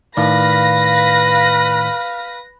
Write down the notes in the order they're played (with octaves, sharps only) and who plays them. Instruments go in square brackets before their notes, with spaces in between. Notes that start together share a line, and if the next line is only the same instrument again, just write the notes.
[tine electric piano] A2 D#3 D5 [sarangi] B4 [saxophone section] F5 [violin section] A#6 B6